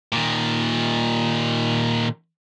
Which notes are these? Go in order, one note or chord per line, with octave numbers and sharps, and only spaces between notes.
A#2 D#3